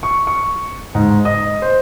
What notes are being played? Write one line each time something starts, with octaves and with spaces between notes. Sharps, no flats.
C#6
C#6
G#2
D#5
C5